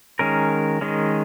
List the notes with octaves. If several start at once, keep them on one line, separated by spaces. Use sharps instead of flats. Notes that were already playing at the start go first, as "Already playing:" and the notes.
D#3 G#3 C#4 A#4
D#3 G#3 C#4